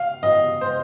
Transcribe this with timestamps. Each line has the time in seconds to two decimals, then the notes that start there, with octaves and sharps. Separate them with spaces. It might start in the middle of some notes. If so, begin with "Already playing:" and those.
Already playing: F5
0.23 D#5
0.61 C5